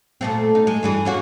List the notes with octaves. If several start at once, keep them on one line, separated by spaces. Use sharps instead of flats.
A#2 A3 C4
D#4
G#3
G2 E3 G#4
A#3 C#4 F#4